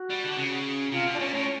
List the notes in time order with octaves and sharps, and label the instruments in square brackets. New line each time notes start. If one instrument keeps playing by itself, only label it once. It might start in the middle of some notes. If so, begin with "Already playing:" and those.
Already playing: [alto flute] F#4
[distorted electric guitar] G3
D3
C#3
[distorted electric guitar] C3 [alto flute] F4
[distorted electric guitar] B2
[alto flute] D4
[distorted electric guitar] A#2 [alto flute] C#4
[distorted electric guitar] A2 [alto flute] C#4